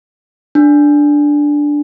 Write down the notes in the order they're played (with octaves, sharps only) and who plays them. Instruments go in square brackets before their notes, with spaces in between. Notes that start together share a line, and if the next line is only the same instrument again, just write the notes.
[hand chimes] D4